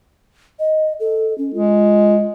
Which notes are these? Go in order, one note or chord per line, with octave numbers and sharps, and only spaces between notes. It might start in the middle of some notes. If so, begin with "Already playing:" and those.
D#5
A4
C#4
G#3 F4